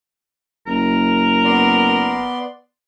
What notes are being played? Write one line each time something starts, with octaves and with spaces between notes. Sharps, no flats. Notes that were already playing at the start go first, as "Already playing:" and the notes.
F#1 A#4
B3 D5 C6